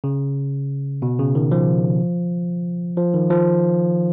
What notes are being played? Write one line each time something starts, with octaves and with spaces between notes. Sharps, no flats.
C#3
B2
C#3
D#3
F3
F3
D#3
F3